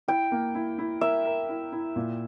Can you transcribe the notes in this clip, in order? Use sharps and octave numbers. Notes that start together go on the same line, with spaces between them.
E4 G5
A#3
E4
E4
A#4 E5
A#4
E4
E4
A#2